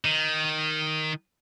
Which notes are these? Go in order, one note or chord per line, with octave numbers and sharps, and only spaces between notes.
D#3